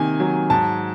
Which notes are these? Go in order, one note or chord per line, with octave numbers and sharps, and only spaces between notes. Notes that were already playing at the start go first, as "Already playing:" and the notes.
Already playing: C3 D#3 A#3 G#5
F#3
G#2 A5